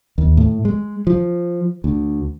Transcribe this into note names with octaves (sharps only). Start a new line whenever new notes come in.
D#2
A2
G#3
F3
D2